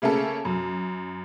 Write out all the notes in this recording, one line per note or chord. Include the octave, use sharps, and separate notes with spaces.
C#3 A3 A#3 C#4 A4
F#2